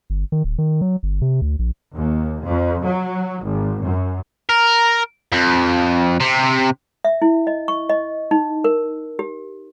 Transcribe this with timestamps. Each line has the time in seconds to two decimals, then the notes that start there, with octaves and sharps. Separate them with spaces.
0.10 G1
0.32 D#3
0.44 D1
0.58 D#3
0.81 F#3
1.03 G1
1.22 C3
1.42 D2
1.59 A#1
1.94 D#2
2.44 F2
2.85 F#3
3.43 G#1
3.84 F#2
4.49 A#4
5.32 F2
6.20 C3
7.05 E5
7.22 E4
7.47 D#5
7.68 C#6
7.90 D#5
8.31 D#4
8.64 A#4
9.19 G4